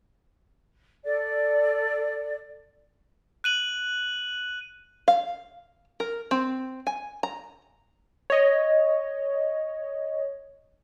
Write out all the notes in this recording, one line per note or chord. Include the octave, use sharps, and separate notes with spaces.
A4 D5
F#6 D#7 F#7
F5
A#4
C4
G#5
A#5
C#5 D#5